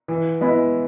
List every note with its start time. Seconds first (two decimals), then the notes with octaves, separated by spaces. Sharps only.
0.08 E3
0.41 G#3 B3 E4